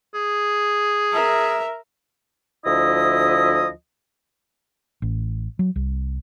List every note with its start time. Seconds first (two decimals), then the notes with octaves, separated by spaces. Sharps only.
0.14 G#4
1.13 A#4 E5
2.64 D2 F3 E4 D#5 D#6
5.02 A1
5.59 F#3
5.76 C2